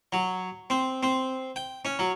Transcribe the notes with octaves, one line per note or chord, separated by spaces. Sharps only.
F#3
C4
C4
G5
C#4
F#3